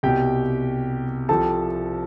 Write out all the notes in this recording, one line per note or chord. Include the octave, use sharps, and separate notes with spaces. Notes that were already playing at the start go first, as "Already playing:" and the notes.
C2 B2 G4 G5
C2 C3 F3 A4 A5